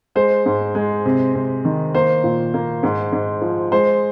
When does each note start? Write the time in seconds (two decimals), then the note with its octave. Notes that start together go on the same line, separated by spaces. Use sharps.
0.15 G#3 C5
0.46 G#2
0.75 G#3
1.06 C3
1.35 C3
1.65 D#3
1.94 A#3 C5
2.24 A#2
2.54 A#3
2.83 G#2
3.12 G#2
3.42 F3
3.72 G#3 C5